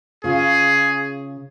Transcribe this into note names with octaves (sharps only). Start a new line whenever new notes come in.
C#3 F4 G#4